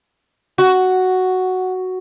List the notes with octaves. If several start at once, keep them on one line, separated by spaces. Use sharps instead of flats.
F#4